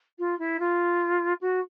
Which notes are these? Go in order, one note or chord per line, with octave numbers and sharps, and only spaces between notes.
F4
E4
F4
F#4